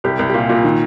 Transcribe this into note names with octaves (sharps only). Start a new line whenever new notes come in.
C2 G4
C2
G4
A#2 F4
A#2
D#3